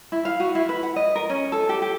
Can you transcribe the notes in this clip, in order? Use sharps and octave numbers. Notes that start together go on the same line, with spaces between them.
E4
F5
F#4
E4
B4
F#5
D#5
A#4
C#4
A4
G4
G4